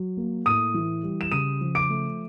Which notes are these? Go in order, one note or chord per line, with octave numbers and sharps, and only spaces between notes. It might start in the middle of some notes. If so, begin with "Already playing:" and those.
Already playing: F#3
A#3
A2 D#6 D#7
E3
G3
E7
C#3 D#6 D#7
F3
D6 D7
A3